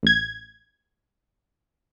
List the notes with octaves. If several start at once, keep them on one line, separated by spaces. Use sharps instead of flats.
A1 G#6